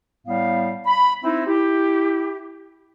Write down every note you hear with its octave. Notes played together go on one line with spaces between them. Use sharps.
A2 G3 B3 F5
B5
C4 D#4 E4
E4 G4